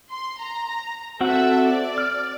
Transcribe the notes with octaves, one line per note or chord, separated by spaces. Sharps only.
C6
A#5
C4 F#4 A4 E5 F#5
D5
F6